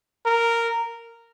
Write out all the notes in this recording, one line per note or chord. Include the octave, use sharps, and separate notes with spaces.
A#4